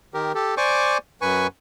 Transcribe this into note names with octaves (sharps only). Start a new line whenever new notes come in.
D#3 G4 A#4
G4 A4
C5 D5 G#5 C#6 D6
F#2 B4 G#5 C#6